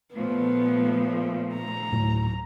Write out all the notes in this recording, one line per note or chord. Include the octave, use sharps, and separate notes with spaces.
A#2 F3 A3 B3
A#5
D2 A2 F#3